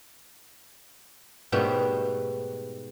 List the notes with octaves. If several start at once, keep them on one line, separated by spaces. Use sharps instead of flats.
G#2 B2 G3 A3 B3 G4